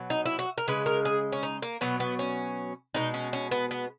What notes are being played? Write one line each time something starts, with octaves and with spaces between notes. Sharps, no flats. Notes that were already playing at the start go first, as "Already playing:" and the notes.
Already playing: B2 F#3
D#4
E4
F#4
A#4
C#3 G#3 B4
A#4
G#4
C#4
D#4
A#3
B2 F#3 B3
B3
C#4
B2 G#3 D#4
C#4
C#4
B3
B3